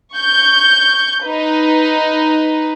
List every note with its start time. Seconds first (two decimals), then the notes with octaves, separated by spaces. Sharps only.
0.14 C#6 G6
1.24 D#4 B4